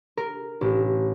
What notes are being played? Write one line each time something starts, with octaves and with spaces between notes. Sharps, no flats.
A#4
A1